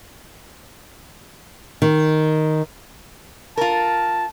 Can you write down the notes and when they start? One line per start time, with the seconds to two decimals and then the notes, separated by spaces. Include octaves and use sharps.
1.82 D#3
3.57 F4 A#4 A5